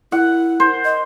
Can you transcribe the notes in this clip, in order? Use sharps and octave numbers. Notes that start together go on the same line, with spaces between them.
E4 F#5
C5
D#5